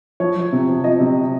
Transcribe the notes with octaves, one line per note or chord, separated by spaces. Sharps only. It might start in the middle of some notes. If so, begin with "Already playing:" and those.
F3 C#5
F3
C3
F3
F3 D#5
C3